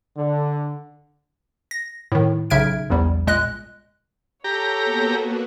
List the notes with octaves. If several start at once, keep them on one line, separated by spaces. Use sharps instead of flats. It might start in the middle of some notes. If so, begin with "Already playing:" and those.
D3
A#6
A2 D#3
B1 C#3 E5 F6 G#6 D7
A#1 E2 G3
A#2 G#3 D#5 F#6
G4 A4 C#5 A#5
A#3 B3 F#4